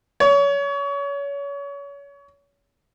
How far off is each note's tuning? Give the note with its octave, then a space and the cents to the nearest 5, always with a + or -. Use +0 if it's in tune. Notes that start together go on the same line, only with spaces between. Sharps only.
C#5 +30